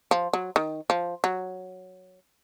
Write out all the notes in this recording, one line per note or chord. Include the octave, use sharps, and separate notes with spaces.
F3
F#3
D#3
F3
F#3